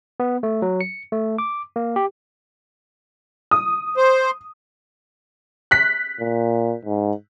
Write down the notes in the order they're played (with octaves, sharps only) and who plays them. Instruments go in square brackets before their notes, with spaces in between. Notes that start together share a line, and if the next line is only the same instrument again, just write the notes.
[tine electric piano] B3
A3
F#3
C#7
A3
D6
A#3
G4
[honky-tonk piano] D#6
[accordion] C5
[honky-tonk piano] F#6 B6
[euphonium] A#2
G#2